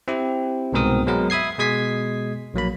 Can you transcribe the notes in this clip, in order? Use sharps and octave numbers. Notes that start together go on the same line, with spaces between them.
C4 E4 G4
C2 G#2 B2 C4 A#4 D#6
F#3 G#3 B3 A#4 B4
E5 B5 D#6 G#6 C7
B2 G#3 D#6 G#6 B6 C7
A#1 F#3 A#3 B5